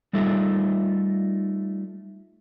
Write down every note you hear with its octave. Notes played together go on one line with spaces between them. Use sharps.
G3 A3 D#4 F4 A4 E5